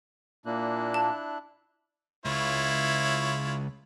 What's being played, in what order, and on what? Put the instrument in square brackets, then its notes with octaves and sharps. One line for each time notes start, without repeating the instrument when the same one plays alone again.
[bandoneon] A#2 A#3 [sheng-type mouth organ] D4 E4 F#6
[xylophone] A5
[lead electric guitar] C#2 [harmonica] E4 F4 C#5